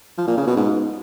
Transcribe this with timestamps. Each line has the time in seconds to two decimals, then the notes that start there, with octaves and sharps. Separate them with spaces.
0.18 F3
0.28 A#2
0.37 C#3
0.47 B2
0.56 G#2